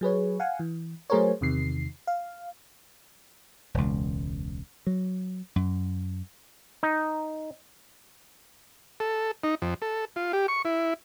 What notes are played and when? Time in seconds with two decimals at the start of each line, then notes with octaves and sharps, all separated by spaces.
0.01 F#3 G#4 B4 C#5
0.40 F5 F#5 G#5
0.59 E3
1.10 F#3 A3 G#4 A#4 C5 C#5
1.41 E2 C3 D#3 C7
2.07 F5
3.74 E1 C#2
4.87 F#3
5.56 F#2
6.83 D#4
9.00 A4
9.44 D#4
9.62 F2
9.82 A4
10.16 F4
10.33 G4
10.48 C#6
10.65 E4